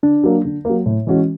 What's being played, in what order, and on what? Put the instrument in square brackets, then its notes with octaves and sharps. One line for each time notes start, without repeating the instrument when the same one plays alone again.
[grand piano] D3 [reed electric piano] D4
[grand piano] F#3 A#3
D3
F#3 A#3
A2
E3 G#3 C#4 F#4